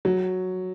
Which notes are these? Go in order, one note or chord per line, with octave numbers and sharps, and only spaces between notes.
F#3